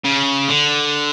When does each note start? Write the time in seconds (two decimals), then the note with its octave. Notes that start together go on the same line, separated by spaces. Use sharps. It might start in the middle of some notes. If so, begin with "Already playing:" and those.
0.04 C#3
0.48 D3